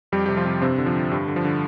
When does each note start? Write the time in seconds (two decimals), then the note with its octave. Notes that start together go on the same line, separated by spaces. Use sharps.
0.12 F2 G3 G4
0.26 C3 G4
0.37 F3 F4
0.45 C3
0.62 G2 C3 C4
0.78 D3
0.86 F3
0.95 D3
1.12 G2 G3
1.28 D3
1.36 F3
1.45 D3